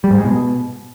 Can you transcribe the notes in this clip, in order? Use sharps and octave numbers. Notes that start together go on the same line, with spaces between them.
G3
G#2
G#3
B2